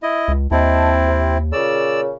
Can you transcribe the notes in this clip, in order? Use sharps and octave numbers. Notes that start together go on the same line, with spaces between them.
E4 D#5
C#2
D#2 C4 E4 D#5 A5
C3
A#2 C#3 D5 E6